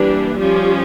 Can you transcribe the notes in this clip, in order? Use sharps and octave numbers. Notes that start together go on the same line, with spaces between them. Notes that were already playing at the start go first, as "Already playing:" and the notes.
Already playing: E3 G3 A#3 D4
F3 G3 C#4 G4